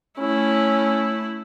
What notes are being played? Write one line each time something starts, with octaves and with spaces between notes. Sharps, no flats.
A3 C#4 E4